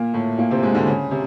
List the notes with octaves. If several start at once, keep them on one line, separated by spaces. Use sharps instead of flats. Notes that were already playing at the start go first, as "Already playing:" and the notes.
Already playing: A#2 A#3
A2 A3
A#2 A#3
C3 C4
G#2 G#3
D2 D3
C#3
C3